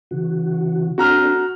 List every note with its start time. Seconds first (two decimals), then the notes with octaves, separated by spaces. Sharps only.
0.11 C#3 E3 F#4
0.98 C4 D4 F#4 A4 A#5 F6